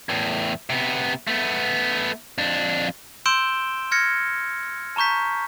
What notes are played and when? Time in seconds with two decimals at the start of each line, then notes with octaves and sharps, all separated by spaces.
0.09 E2 A2
0.70 C3 B3
1.27 A3 B3
2.38 F2 D4
3.26 C6 E6 G6 D7 E7 G7
3.92 F6 G#6 A#6 C#7
4.96 A5 A#5 C#6 G6 B6